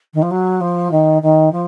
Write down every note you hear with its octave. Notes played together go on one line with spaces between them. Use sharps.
D#3
F3
F#3
F3
D#3
D#3
F3